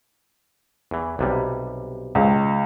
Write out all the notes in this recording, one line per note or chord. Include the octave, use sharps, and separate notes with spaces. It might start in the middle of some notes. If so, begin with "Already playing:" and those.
E2 E3
B1 C3 G3
C#2